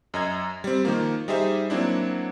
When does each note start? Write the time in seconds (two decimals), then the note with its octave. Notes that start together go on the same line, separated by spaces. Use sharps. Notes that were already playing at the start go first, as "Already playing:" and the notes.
0.14 F#2 D#5 A#5 G#6
0.64 G3 C4
0.85 D#3 F3 A#3
1.28 G3 D#4 G4 G#4 C5 E5
1.70 F#3 A#3 C4 D4 E4